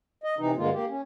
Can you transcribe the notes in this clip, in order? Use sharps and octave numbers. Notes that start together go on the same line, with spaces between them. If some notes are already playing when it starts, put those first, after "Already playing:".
D#5
C3 E3 D#4
G2 D3 G#3 A#3 F4
A#3 G4
C#4